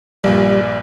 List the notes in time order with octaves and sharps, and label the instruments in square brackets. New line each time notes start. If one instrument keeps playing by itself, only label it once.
[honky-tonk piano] A#1 G2 A#2 [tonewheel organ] G3 [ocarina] D5